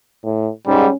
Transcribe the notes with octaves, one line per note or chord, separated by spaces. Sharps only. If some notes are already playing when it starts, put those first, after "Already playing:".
A2
G#2 G3 C#4